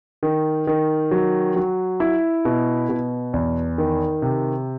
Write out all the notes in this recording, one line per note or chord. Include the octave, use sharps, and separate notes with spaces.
D#3
D#3
F#3
F#3
E4
B2
B2
E2
D#3
C3